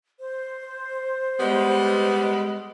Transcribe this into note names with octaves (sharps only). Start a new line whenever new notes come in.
C5
G3 G#3 B3